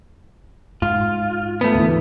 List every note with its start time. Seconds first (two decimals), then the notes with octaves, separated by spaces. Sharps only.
0.82 G#2 F4
1.61 A3 B3
1.74 D2 E3